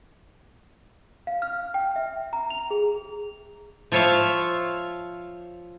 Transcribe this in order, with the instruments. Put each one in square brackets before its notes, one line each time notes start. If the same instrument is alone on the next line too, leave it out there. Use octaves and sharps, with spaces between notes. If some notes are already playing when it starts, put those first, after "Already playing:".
[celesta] F5
F6
G5
E5
A#5
F7
G#4
[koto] F3 F4 C#5 E5 F5